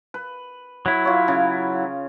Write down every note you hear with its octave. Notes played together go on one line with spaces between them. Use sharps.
B4
F#3 E4
F4 C#5
C#3